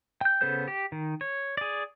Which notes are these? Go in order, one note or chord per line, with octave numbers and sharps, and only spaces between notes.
G5 G6
C#3 B3 A4 C5 G6
G4
D#3
C#5
G#4 D5